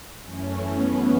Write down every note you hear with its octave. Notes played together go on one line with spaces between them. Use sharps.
F#2 E3 A3 C#4
B3